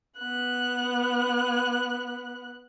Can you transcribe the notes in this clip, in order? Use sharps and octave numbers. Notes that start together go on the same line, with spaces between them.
B3 F#6